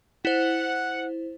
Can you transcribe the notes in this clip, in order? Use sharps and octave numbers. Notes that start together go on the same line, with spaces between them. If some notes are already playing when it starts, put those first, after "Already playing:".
E4 C5 F#5